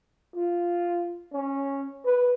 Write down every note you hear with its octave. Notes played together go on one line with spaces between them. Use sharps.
F4
C#4
B4